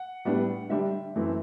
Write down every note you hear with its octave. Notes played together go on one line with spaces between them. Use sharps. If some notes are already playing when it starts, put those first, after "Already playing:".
Already playing: F#5
A2 G3 B3 D4
D3 G3 D4 E5
F#2 E3 A3 C4